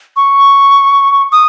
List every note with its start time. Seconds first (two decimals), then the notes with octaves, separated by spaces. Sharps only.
0.16 C#6
1.32 D#6